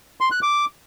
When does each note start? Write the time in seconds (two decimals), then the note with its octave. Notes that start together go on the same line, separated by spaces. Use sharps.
0.21 C6
0.31 F#6
0.42 D6